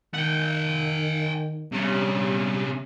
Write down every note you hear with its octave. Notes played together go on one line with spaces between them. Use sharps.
D#3 F#5 G5
C3 G3 C#4